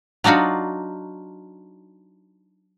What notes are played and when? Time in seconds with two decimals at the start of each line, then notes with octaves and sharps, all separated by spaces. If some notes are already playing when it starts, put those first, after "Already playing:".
0.24 F#3 D4 D#4 F4 F#4